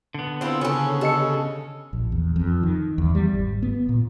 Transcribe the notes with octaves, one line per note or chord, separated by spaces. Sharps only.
D3 B3
C4 E4 F4
C#3 C#4 A4
G4 A4 D#5 C#7
A#1
E2
F2
D#3
E2
G3
G#1
B3
A#2